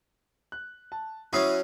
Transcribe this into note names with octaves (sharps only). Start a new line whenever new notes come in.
F#6
A5
F#3 C#4 E4 F#4 D#6 C7